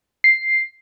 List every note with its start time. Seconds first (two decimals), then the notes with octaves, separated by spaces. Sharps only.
0.24 C7